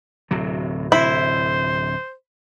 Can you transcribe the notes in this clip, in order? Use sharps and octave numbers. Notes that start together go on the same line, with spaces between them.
D1 C3 F#3
D1 C3 E4 C5